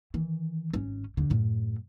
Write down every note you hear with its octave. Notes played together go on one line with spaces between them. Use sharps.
D#3 E3
G#1 C#4
D#2 D3
F#2 A2